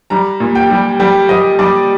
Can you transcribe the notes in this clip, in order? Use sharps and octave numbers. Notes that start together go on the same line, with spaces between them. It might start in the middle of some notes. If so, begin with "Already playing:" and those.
G3 A#5
A#2
G5
G3
G3 G5
G3 D#5
G3 D5